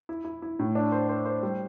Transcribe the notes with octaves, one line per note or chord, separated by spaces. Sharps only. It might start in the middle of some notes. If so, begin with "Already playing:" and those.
E4
E4
E4
A2
D4
C5
C5
C5
G3